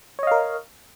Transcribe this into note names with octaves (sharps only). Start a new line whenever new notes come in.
A#4 C#5 D#5 F5